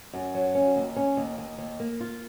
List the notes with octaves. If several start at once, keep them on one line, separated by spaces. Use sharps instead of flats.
F#2
F#3
C#4
D#2
C#4
D#2
D#2
D#2
A#3
F4